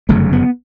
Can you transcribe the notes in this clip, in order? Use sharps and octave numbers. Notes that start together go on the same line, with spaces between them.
G1 F#2 C#3 A3
B3